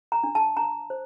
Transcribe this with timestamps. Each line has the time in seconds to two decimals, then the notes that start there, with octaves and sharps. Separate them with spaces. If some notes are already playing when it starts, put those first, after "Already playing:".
0.12 A#5
0.24 D4
0.35 A5
0.57 D4 A#5
0.90 C5